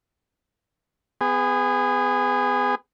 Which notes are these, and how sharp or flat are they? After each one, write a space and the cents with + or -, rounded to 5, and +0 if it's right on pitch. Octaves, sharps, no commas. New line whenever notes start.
B3 +25 G#4 -20